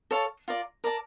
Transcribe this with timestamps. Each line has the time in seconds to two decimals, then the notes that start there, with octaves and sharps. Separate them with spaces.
0.11 A4 C#5 F5 A5
0.48 F4 A#4 D5
0.84 A#4 D5 A5